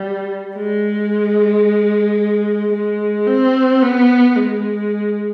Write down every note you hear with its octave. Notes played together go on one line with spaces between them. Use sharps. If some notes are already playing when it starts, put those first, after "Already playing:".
Already playing: G3
G#3
G#3
C4
B3
G#3